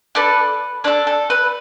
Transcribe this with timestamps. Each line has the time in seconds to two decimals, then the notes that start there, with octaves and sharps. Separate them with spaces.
0.15 D4 A4 B4
0.84 D4 A4 C#5
1.07 A4
1.30 B4